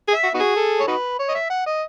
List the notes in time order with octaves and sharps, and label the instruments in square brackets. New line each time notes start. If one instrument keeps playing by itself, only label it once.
[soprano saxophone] G#4
[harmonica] E5
[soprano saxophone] F#4
[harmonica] B3 D#4 F#4
[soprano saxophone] G#4
[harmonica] A4
C#5
D#4 F#4 B4
C#5
D#5
E5
F#5
D#5